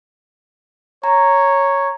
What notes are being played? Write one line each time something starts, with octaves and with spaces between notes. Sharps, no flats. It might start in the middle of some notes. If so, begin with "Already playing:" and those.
C#5 A#5